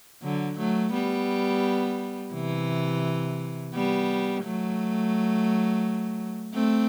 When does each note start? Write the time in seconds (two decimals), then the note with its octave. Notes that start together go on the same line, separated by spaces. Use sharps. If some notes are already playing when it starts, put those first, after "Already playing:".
0.22 D3 F#3
0.58 F#3 A3
0.93 G3 B3
2.33 C3 E3
3.74 G3 B3
4.43 F#3 A3
6.54 A3 C4